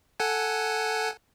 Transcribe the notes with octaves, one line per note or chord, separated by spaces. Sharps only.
A4 F#5 G#5